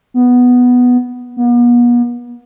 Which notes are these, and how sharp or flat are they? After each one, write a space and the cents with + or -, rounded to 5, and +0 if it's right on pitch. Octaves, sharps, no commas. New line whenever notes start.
B3 +0
B3 -45